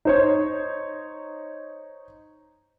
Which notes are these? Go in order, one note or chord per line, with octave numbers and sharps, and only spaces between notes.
D#4 C5 C#5